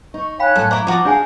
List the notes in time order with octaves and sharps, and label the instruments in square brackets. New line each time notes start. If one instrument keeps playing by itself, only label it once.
[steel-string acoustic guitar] D#4 [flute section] C#6
[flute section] C#5 G#5 F#6 [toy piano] F5 G5 B5
[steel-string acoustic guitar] F#2 A2 [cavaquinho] A4
[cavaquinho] E4 A#5 [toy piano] C5 D5 C#6 [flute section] D6
[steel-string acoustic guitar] F3 [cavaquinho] D#4 F#4 [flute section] A5 D6
[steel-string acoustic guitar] D4 G#4 [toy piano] C#5 G#5 [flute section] F5